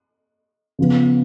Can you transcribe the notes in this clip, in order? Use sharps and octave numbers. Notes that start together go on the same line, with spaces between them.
C#3 F3 B3